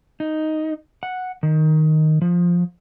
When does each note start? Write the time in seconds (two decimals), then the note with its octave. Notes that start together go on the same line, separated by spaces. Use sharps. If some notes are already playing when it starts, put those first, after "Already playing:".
0.20 D#4
1.03 F#5
1.43 D#3
2.22 F3